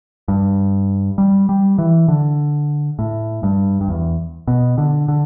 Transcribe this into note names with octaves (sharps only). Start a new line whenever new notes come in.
G2
G3
G3
E3
D3
A2
G2
G2
E2
B2
D3
D3